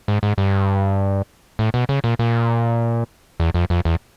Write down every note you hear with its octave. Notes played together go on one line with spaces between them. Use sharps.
G#2
G#2
G2
A2
B2
C#3
A#2
A#2
E2
F2
F2
E2